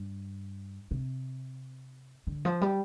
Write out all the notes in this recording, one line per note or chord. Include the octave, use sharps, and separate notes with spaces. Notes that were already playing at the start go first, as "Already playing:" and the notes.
Already playing: G2
C3
D3
F3
G3